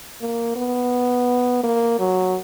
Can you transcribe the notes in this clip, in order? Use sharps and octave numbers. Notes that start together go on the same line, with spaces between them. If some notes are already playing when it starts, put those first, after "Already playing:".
A#3
B3
A#3
F#3